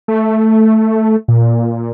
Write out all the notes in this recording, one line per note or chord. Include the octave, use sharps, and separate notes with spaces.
A3
A#2